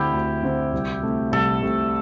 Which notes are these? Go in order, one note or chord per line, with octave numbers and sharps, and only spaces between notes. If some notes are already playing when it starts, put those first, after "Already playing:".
Already playing: D2 D3 C4 E4 G4
D2
D3 C4
C2
C3 A3
C2 A4
C3 A3